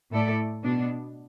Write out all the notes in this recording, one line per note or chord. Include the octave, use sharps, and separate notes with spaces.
A2 A3 E4 A4 D5
B2 B3 D4